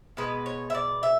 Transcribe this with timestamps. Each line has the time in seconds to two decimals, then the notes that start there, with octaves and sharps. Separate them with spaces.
0.17 B2 G#3 B3 B4
0.46 C#5
0.70 E5
0.75 D5
1.03 E5